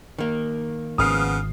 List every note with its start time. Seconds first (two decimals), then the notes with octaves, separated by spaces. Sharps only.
0.18 D#3 A#3
0.98 G#1 C#3 F3 B3 D#6 F6 C7